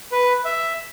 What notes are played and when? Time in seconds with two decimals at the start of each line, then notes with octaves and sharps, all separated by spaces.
0.12 B4
0.45 E5